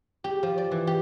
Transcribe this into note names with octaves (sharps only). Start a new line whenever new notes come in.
G4
F3
D5
E3
G4